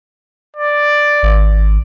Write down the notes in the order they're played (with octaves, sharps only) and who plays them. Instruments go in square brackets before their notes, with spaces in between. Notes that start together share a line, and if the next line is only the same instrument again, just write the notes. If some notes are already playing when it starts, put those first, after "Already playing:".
[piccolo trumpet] D5
[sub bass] G#1